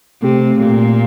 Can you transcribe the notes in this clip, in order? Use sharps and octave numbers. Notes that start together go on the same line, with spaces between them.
C3 A3 C4 G4
A#2 A3 C4 G4